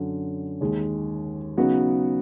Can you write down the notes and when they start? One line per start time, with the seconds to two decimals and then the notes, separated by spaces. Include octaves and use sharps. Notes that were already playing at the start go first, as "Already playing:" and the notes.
Already playing: F#2 D3 F#3
0.61 D#2 D#3 G#3
1.57 C#3 F#3 B3 D#4 F#4